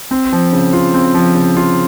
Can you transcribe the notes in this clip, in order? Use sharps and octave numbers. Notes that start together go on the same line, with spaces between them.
C4
F3
C#3
F4
C4
F3
C#3
F4